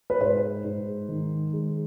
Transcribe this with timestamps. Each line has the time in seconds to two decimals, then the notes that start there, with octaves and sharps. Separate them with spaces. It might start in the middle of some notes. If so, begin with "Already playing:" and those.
0.10 B4
0.21 G#2 C5
0.65 G#2
1.09 D#3
1.53 G#3